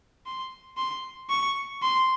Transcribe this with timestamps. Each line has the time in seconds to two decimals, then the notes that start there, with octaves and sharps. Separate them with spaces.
0.26 C6
0.77 C6
1.30 C#6
1.83 C6